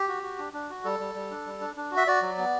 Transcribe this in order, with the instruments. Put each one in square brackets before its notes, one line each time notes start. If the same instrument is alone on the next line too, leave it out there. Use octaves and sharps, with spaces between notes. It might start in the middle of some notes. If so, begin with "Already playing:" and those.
Already playing: [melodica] G4
F#4
F#4
D4
D4
F#4
G3 A4
G3
G3
D4
G3
D4
D4
F#4
E5
F#4 D5
F#3
B3